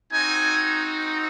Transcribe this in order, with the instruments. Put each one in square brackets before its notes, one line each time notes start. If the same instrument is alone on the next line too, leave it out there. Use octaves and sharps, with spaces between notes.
[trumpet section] C4 D#4 F#4 G#5